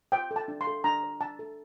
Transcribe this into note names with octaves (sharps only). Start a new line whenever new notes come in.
C5 G5
A4
A5
D4
C6
A4
D4 A#5
C5
D4 A5
A4